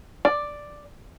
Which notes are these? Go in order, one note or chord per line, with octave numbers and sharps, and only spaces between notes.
D5